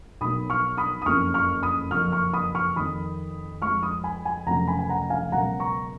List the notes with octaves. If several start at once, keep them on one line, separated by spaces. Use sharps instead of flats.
B1 B2 F#3 A#3 B5 D#6
C#6 F6
B5 D#6
D#6
F#1 F2 C#3 F3 A#3 C#6 F6
C#6 F6
B5 D#6
F#1 F2 F3 A#3 C#6 F6
C#6 F6
B5 D#6
C#6 F6
F2 D#3 A#3 B5 D#6
F2 F3 G#3 C#6 F6
B5 D#6
G#5 B5
G#5 B5
F1 F2 C#3 F#3 A#3 F#5 A#5
G#5 B5
G#5
F#5 A#5
F5 G#5
C#2 B2 F#3 A#3 F#5 A#5
A#5 C#6